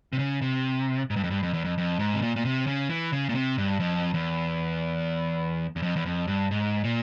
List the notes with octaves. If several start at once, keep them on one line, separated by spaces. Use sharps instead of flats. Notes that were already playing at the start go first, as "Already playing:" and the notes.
C3
C#3
C3
G#2
G2
F2
G2
F2
E2
F2
F2
G#2
C3
A#2
A#2
C3
C#3
E3
C#3
A#2
C3
G2
F2
E2
E2
F2
E2
F2
G2
G#2
A#2